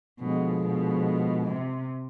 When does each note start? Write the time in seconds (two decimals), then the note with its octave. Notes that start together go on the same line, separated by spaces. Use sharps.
0.19 B2 D3 F3 G#3
0.62 B2
1.46 C3